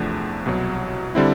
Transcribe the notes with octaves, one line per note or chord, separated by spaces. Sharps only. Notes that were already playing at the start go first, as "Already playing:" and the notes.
Already playing: E2 C3 F3 A3 D4
C2 B2 F#3
D3 G3 C4 E4